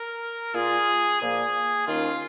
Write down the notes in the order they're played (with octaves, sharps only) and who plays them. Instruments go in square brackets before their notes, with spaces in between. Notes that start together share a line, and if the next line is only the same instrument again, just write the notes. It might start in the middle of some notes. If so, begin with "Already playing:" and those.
Already playing: [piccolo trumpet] A#4
[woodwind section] A#2 A#3 F4 [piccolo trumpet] G#4
[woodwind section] A#2 F3 A#3 [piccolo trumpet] G#4
[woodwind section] D#2 D#3 A#3 C#4 [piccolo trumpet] F4